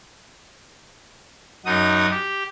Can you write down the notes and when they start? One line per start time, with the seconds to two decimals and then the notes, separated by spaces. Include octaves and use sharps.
1.66 F#2 D#4 F#4 D#6
2.10 G4